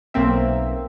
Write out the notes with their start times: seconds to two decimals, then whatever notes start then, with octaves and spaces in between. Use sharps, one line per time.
0.14 B1 A#3 C4 E5